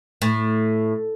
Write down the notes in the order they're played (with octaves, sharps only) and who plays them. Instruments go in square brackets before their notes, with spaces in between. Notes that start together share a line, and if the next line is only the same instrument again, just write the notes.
[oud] A2